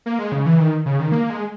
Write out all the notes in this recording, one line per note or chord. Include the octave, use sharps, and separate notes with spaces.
A#3
G#3
C#3
E3
D#3
C#3
D#3
A#3
G#3